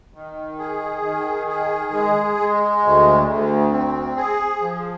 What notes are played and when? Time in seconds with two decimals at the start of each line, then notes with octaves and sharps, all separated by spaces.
0.14 D#3
0.59 G#4
1.03 D#3
1.47 G#4
1.92 G#3
2.37 G#3
2.82 D2
3.27 D2
3.71 C4
4.16 G#4
4.61 F3